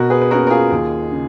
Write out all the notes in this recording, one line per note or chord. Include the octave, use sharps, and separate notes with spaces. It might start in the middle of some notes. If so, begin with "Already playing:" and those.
Already playing: B2 F#4 A#4
G#4 B4
B4
A#3 C#4 F#4 A#4
A#4
F4 G#4
D#2
C#3